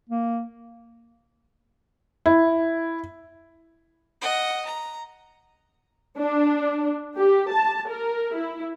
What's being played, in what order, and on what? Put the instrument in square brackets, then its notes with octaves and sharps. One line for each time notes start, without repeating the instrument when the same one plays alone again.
[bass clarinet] A#3
[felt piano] E4
[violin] D#5 F#5
A#5
[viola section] D4
G4
A5
A#4
E4